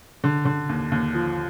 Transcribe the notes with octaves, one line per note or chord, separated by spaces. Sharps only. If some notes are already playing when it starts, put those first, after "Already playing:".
D3
D3
D#2
D#2
F3